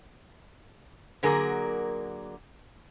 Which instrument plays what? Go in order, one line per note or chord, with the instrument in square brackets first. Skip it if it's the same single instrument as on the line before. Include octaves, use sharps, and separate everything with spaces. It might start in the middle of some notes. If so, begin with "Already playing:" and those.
[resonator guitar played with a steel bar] D3 F#3 A#3 G#4 A#4